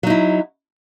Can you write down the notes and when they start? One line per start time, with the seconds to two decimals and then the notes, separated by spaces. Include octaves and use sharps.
0.03 F#3
0.07 D#4
0.10 E4